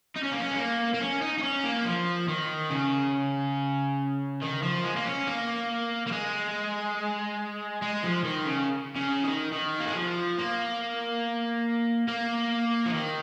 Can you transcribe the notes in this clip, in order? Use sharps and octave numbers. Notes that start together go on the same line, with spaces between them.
D#4
C#4
A#3
C#4
G#3
A#3
A#3
C#4
D#4
D#4
C#4
A#3
F3
D#3
C#3
D#3
F3
G#3
A#3
C#4
A#3
A#3
G#3
G#3
F3
D#3
C#3
C#3
D#3
D#3
A#3
G#3
F3
A#3
A#3
F3
D#3